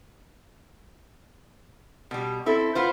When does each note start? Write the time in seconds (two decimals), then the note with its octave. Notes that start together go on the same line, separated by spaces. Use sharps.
2.11 B2 G3
2.46 C4 E4 A4
2.75 B3 F4 C5